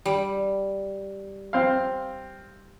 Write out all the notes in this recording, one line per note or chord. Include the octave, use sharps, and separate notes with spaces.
G3
C4 F5